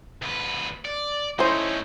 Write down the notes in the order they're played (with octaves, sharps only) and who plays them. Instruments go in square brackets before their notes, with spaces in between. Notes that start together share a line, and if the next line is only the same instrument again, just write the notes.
[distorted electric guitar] D2 B4
D5
[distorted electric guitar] A3 D#4 [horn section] C#4 E4 [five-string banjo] A4 C5